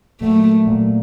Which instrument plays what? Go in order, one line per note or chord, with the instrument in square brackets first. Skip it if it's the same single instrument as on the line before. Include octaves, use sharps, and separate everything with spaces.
[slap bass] A#2 F#3 A#3 [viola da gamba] A3
[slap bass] A#2 F#3 A#3